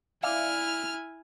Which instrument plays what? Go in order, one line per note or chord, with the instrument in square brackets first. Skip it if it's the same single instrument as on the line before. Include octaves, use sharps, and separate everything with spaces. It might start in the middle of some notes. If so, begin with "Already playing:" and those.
[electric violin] E4 G#5 [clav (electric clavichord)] D5 E5 F5 [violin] F6